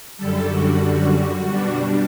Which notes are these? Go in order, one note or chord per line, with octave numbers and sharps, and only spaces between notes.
F#2 D3 G3 A4
F#4
F#4
B2 G3 D4 F#4